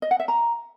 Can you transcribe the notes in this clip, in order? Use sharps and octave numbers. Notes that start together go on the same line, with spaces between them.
D#5
F#5
E5
A#5